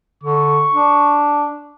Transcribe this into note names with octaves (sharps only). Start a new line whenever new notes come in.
D3 C#6
D4